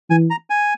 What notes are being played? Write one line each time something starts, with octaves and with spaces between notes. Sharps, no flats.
E3 G#5
A#5
G#5